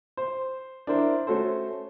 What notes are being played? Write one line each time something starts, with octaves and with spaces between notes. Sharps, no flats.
C5
D4 E4 A#4 C5
A3 C#4 F#4 A4 C5